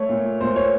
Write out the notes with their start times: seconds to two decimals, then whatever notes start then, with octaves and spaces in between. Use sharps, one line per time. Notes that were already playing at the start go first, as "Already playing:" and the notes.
Already playing: A3 C#5
0.09 A#2
0.41 A#2 C5
0.56 C#5